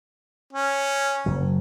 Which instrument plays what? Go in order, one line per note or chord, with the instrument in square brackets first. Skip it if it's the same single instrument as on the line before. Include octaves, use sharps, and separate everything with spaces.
[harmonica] C#4
[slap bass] F#1 F#3